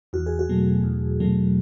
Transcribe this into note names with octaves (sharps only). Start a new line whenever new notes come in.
E2 F#4
G#4
F#4
B2 F#3 A3
E2
B2 F#3 A3